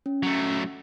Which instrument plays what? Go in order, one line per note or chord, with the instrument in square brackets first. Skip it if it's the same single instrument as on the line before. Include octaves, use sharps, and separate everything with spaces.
[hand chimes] C#4
[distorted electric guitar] F#3 A3